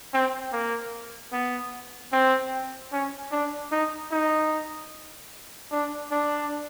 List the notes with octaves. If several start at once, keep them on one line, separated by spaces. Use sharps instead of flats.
C4
A#3
B3
C4
C#4
D4
D#4
D#4
D4
D4